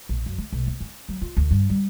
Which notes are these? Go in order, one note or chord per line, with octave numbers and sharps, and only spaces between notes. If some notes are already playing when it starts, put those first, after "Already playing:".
A#1
F#2
A3
B1
B3
C#4
F#3
F4
D2
G2
G3